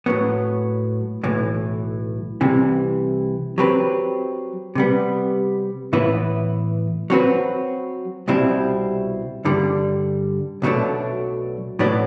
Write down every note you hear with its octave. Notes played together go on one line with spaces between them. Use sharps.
A2 F#3 B3
B1 A2 E3
C2 C3 E3
F#3 C4 G4 B4
C3 G3 B3
A2 E3 B3 E4 B4
F#3 C4 F#4 B4
C2 B2 G3 C4 E4
G2 D3 G3
B1 B2 F#3 A3 D4
B1 A2 F#3 B3 D4